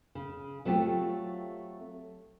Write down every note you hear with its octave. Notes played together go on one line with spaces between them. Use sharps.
C#3
F#3 A3 C4 F4 G4